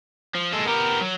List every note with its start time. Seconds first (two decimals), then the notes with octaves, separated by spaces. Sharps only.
0.35 F3
0.53 G#3 A4
0.66 B3 G4 A#4
1.02 F#3